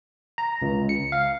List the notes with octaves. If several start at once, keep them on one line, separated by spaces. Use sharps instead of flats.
A#5
C#2
C#7
F5